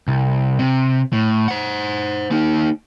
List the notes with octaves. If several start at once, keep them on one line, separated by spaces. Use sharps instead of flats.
C2
C3
A2
C5 F#5
A#3 D#4